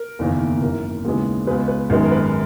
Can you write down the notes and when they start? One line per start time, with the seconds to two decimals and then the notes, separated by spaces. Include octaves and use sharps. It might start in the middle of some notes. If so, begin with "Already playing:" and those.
Already playing: A#4
0.19 F#1 E2 D#3 A#3
0.61 G#1 F#2 E3 A#3
1.05 D#2 C#3 E3 G#3 B3
1.47 C#2 B2 G#3 B4
1.68 B4
1.90 G#1 F#2 D#3 G#3 B3
2.06 A#4
2.11 B4